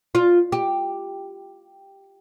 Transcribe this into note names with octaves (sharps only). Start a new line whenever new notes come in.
F4
G4